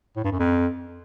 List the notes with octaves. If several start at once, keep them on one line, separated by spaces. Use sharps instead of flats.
A2
G2
F#2
F2